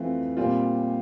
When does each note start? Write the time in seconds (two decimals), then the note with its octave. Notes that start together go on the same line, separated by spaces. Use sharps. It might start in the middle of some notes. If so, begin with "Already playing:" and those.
Already playing: F2 E3 A3 C4 F4
0.37 A#2 G3 C4 F4